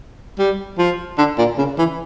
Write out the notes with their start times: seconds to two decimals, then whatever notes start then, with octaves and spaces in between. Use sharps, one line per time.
0.39 G3
0.78 F3
1.18 D3
1.38 A#2
1.58 C#3
1.78 E3